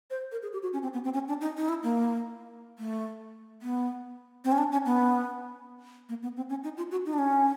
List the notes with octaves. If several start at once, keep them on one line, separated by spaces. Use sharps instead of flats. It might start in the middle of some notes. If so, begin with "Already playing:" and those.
C5
A#4
G#4
G4
F#4
C#4
C4
B3
C4
C#4
D4
D#4
D#4
E4
A#3
A3
B3
C4
C#4
D4
C#4
B3
A#3
B3
C4
C#4
D#4
F4
F#4
D#4
D4
C#4